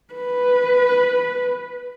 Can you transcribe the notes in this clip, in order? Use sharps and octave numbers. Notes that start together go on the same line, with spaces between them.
B4